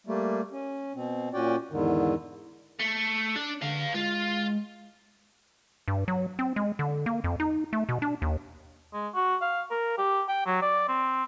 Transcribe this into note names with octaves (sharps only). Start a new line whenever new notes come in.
G3 A3 A#3
C#4
B2 C4
A#2 C#4 F#4 D5 G5
E2 G#2 D3 D#3
A3
D4
D3 B4 F5
G#3 F4
G2
F#3
C4
G#3
D3
A#3
F2
D#4
A3
B2
D4
D#2
G#3
F#4
F5
A#4
G4
G5
F#3
D5
C4